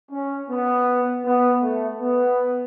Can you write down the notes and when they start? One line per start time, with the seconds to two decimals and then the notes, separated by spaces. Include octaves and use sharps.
0.12 C#4
0.50 B3
1.25 B3
1.62 A3
2.00 B3